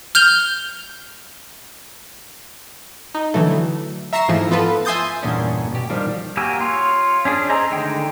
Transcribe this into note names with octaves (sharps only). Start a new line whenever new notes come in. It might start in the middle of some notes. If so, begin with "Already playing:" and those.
F6 G6 F7 G7
D#4
D3 E3 F#3 A3
E5 A#5 C#6 A#6 C7 E7
G#2 E3 F3 A3
B3 F4 A4 B4
E5 G#5 C6 D#6 G6 A6
E2 G2 A#2 C#3 C#4 D4
B2 G4
D#3 F3 G3 D4 G4
A#3 F#4 G4 G#5 E6
F4 C#5
C#4 D4 G#4
G#4 C5 D#5 A#5 E6
D3 D#3 G#3 A3 G5